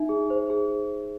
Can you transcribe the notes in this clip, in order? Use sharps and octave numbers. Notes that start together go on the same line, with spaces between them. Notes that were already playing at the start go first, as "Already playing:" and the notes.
Already playing: D#4 E5
G#4
C5
G#4